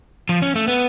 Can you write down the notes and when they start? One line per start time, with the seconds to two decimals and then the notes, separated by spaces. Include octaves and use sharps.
0.29 F3
0.42 C#4
0.55 A3
0.68 B3